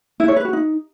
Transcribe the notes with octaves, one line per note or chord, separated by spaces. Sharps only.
E4
C#5
B4
F#4
D#4